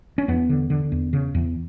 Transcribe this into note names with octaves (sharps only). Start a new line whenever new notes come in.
C#4
E2 B3
D3
D3
E2
C#3
E2